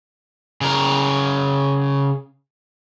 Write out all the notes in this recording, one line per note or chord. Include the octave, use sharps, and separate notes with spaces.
C#3 A#4